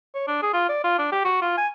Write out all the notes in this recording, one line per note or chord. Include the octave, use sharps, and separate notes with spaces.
C#5
D4
G#4
F4
D5
F4
D4
G4
F#4
F4
G#5